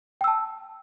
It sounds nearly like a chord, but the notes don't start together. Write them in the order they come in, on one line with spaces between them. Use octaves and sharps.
G5 E6 A5